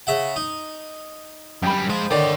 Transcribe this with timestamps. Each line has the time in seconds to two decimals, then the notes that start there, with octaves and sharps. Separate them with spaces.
0.07 C#3 E5 F#5
0.36 D#4
1.63 F#2 G3 G5 B5
1.90 F3 G#3 C5
2.11 D3 D#3 C#5 D5 G5